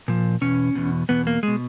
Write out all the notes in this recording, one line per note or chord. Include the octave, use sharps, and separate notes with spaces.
A#2 F3
E2 B2 C#4
E2 B2
E2 B2 B3
A#3
B2 G#3